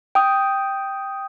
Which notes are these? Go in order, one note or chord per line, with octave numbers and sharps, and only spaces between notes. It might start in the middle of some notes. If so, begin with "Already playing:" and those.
G5 D#6